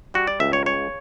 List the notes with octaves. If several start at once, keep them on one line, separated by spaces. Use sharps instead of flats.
G3 F#4
D5
C#2 E5
C#5
C#3 C#5